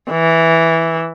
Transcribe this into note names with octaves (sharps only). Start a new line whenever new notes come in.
E3